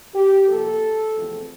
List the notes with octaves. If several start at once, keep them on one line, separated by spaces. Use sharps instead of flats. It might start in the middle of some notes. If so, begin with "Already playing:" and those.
G4
C3 F3 A#3 A4
E2 C3 F3 A3 C4